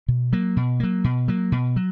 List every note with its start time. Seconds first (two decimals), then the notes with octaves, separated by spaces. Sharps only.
0.08 B2
0.33 F#3 A#3
0.57 B2
0.80 F#3 A#3
1.04 B2
1.28 F#3 A#3
1.52 B2
1.76 F#3